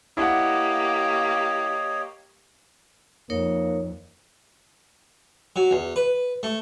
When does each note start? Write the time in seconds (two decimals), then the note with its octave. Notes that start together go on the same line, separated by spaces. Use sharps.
0.17 A#3 E4 G4 C#5 D#5 F#5
3.30 F2 A#3 D#4 A#4 C#5
5.56 F#3
5.71 E2
5.96 B4
6.43 A3